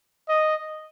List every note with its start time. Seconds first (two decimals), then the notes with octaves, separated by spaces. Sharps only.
0.29 D#5